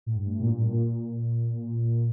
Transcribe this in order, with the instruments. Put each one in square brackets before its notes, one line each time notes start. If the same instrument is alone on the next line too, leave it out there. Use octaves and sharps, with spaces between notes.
[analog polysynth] A2
G2
A2
A#2
A#2
G2
A#2